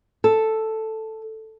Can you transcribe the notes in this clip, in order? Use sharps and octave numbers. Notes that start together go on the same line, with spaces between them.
A4